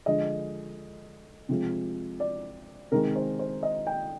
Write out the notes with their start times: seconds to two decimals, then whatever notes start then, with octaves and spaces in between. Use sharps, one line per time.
0.06 D3 F3 G#3 D#5
1.49 C3 F3 G#3
2.20 D5
2.91 C3 D#3 G#3 A#4
3.16 C5
3.39 C5
3.63 D#5
3.87 G5